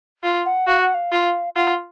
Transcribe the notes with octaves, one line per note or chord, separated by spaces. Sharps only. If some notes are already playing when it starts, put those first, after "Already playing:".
F4
F#5
F#4 F5
F#5
F5
F4
F4 F#5